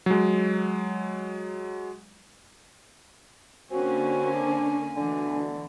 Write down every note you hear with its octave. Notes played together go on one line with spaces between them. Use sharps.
F#3 G#3
D3 A#3 C4 C#4 F#4 G#5
D4
D2 B2 D3 E3 D4